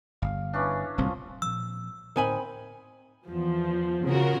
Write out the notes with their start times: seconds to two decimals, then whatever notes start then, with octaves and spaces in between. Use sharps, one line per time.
0.22 G1 F5
0.53 E3 C#4 D4
0.98 D1 C2 F3 C4
1.42 A#2 F3 E6
2.16 A2 D3 C4 D#4 A#4 G#5 B5
3.26 E2 F3
4.05 C#3 F4 F#4 A#4